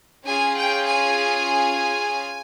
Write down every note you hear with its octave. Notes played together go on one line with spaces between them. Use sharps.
C#4 F4 G#4 G#5
G5
G#5